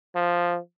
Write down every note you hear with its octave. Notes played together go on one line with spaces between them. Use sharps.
F3